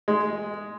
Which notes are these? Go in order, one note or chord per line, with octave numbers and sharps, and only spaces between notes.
G#3